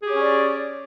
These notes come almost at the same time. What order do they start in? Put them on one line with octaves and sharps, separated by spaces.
G#4 G4 C#5 C#4 D5